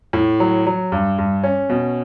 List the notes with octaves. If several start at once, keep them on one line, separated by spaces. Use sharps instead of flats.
A2
F#3
F#3
G2
G2
C#4
B2